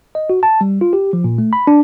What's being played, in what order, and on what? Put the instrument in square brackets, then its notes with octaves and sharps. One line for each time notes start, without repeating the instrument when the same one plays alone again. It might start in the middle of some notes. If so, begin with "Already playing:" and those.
[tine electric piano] D#5
F#4
A5
G3
F4
G4
F3
A#2
A3
B5
D4